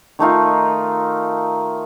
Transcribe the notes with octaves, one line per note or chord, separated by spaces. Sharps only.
D#3 A3 D#4 F4